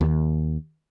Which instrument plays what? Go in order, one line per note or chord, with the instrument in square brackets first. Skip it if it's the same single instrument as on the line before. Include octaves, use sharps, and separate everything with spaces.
[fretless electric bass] D#2